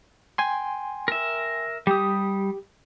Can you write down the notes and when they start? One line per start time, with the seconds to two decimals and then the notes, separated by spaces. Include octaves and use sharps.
0.38 G5 G#5 C6
1.08 A#4 E5
1.87 G3 G4 D#6